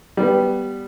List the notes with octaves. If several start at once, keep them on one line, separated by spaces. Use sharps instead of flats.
G3 B3